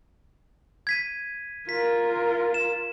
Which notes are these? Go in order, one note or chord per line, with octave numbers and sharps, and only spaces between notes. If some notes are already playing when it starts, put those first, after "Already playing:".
G#6 B6 D#7
F4 A#4 B6
E7